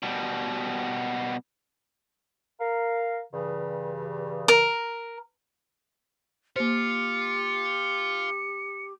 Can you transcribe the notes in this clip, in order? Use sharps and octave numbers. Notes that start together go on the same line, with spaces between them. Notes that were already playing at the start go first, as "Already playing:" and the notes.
B2 G3
A#4 F5
G2 C#3 E3
A#4
A#3 F4 G4 C5 C#7